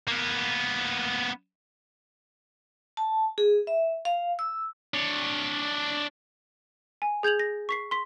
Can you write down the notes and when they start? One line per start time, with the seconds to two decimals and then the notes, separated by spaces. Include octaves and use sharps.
0.08 A#3 B3
2.97 A5
3.38 G#4
3.67 E5
4.05 F5
4.39 E6
4.94 D4 C#5
7.02 G#5
7.23 G#4 G6 G#6 F7 F#7
7.39 A#6
7.69 C#6 B6 C7
7.91 C6 B6